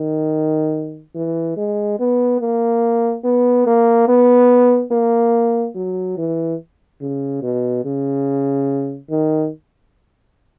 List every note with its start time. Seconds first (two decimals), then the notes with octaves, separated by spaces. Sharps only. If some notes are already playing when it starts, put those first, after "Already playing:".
Already playing: D#3
1.15 E3
1.57 G#3
1.99 B3
2.41 A#3
3.24 B3
3.67 A#3
4.08 B3
4.92 A#3
5.75 F#3
6.18 E3
7.01 C#3
7.43 B2
7.85 C#3
9.11 D#3